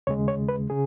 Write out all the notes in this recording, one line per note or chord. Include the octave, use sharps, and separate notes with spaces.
D#2 C#3 G#3 C#5
C#5
B4
C#3 G#4